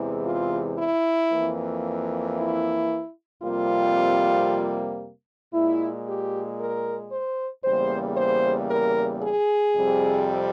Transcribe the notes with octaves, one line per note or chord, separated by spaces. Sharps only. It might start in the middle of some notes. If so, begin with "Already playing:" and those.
Already playing: E2 C3 E3 G#3
F4
E4
F2 E3 A#3
E4
F2 C3 G3 A#3 F4
A#2 G#3 E4
G4
A#4
C5
E2 C#3 G3 A#3 C5
C5
A#4
G#4
F2 C3 G3